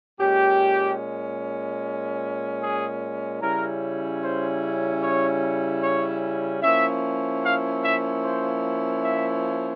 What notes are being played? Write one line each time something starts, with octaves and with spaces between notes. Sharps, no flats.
A#2 G#3 C#4 G4
G#4
C#3 G3 C#4 E4 A#4
C5
C#5
C#5
F3 A#3 C#4 E4 E5
F5
E5
C5
E5